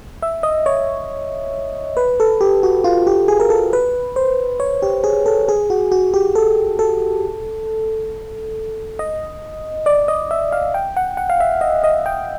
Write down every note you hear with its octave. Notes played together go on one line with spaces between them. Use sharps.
E5
D#5
C#5
B4
A4
G4
F#4
F4
G4
G#4
A#4
A4
B4
C5
C#5
G4
G#4
A4
G#4
F#4
F#4
G4
A4
A4
D#5
D5
D#5
E5
F5
G5
F#5
F#5
F5
E5
D#5
D#5
G5